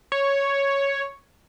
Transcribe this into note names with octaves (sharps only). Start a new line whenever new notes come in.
C#5